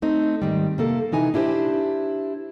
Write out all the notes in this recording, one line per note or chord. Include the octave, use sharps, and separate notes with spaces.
A3 C4 D#4
G#2 D#3 G3
C3 A#3 A4
C3 E3 D#4 G#5
D4 E4 G4 A#4 C5